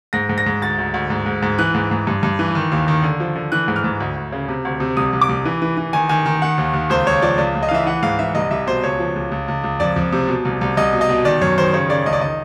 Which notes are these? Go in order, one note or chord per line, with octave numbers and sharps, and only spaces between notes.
G#2 A#6
G#2
A#6
G#2
D2 A6
D2
D2
G#2
G#2
G#2
E3 F#6
G#2
G#2
G2
G2
E3
D#3
D#2
D#3
D3
F3
D3
E3 F#6
G#2
F6
G#2
D2
D2
C#3
C3
D2
C3
C2 D#6
C2
D6
C2
E3
E3
E3
D#3 G#5
D#3 G#5
D#3
D#3 F#5
D#2
D#2
C#2 C5
C#2 C#5
F3 D5
C#2 D5
C#2
D#5
F5
E3 E5
E3 F#5
G#2 F5
E3 E5
C2 D#5
C2 E5
B2 C5
C#2 C#5
F3
C#2
C#2
C#2
C#2
F2 D5
F2
C3
B2
C2
C2
C2 D#5
B2
D#5
B2
D#3 D5
F#2 C#5
D#3 C5
C#3 C#5
C#3 D5
C#2 D#5
D5
D#3 D#5